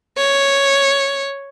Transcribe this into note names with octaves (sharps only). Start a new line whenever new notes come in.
C#5